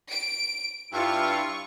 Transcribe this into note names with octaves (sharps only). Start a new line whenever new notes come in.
D7
G2 E4 F4 C#6